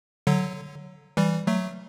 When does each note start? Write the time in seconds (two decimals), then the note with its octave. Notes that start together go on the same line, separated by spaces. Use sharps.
0.27 D3 F#3
1.17 E3 G3
1.47 F#3 A3